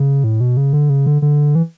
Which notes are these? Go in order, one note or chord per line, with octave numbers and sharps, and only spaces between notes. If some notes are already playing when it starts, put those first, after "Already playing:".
Already playing: C#3
A2
B2
C#3
D3
C#3
D3
D3
E3